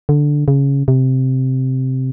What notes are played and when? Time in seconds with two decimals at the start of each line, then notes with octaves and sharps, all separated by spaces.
0.09 D3
0.48 C#3
0.88 C3